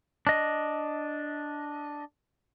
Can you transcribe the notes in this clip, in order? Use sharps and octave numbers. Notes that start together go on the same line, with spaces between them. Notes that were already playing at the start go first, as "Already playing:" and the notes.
D4 D#5